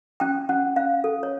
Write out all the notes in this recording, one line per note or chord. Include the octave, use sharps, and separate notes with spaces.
C#4 G5
C#4 F#5
C#4 F5
A4
C#5